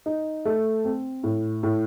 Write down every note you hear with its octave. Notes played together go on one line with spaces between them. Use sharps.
D#4
A3
C4
A2
A2